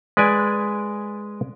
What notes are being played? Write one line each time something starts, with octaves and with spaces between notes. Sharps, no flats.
G#3 B4 D5 G#5